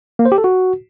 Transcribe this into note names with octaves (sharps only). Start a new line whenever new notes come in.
A#3
C5
G4
A4
F#4